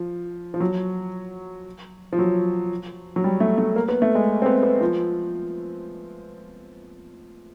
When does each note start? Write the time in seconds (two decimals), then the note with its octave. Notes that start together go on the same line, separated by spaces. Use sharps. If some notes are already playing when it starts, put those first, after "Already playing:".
Already playing: F3
0.54 F3
0.60 F#3
2.13 F3
2.19 F#3
3.16 F#3
3.24 G3
3.40 A3
3.58 A3
3.76 A#3
3.88 B3
4.02 A3
4.15 G#3
4.42 C4
4.46 B3
4.63 B3
4.81 F3